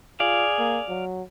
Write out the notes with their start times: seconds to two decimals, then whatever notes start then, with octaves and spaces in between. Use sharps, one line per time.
0.20 F4 G#4 D5 F5
0.59 A#3
0.88 F#3